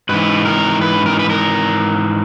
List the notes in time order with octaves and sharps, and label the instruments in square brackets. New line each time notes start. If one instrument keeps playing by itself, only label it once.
[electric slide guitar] G#2 E3 B4
A#4
B4
A#4
B4
A#4